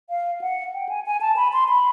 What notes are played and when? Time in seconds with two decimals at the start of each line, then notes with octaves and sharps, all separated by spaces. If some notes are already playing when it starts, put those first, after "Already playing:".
0.10 F5
0.41 F#5
0.74 G5
0.89 G#5
1.06 G#5
1.21 A5
1.37 B5
1.53 C6
1.69 B5